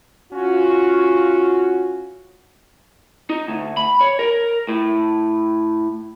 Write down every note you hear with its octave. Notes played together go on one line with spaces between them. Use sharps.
C#4 F4 F#4
D#4
D2
B5
C#5
A#4
A2